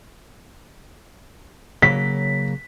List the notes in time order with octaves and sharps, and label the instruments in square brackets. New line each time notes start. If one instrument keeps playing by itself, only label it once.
[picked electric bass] C#3 F#3 A#3 [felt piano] B6